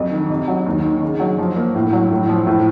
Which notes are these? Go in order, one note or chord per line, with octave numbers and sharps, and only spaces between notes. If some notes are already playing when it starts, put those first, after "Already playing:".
Already playing: F2 F#3
D#3
C3
F#3
D#2
D#3
C#3
F#3
F3
A#3
A2
F#3
A2
F3
A2